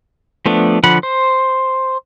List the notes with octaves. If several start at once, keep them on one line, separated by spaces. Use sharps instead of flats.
F3 A3 B3 D4
D3 F3 F#5 B5
C5